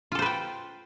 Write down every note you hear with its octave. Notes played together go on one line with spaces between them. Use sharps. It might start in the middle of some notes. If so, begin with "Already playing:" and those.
F4 A4 B4 C5 G5